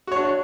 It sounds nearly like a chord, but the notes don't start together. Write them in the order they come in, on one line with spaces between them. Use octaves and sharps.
F#4 C#5 D4